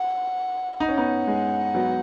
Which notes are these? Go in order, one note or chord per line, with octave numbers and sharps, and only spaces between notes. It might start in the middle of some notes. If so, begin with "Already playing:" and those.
Already playing: F#5
D#4 F#5
C#4
B3 D#4
G#3
F#3 B3